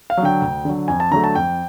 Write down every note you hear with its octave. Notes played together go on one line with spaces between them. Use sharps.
F5
F#3
D3 G5
D2
D3 F#3
F2 G#5
A5
D3 F#3 A3 A#5
A5
F2 G5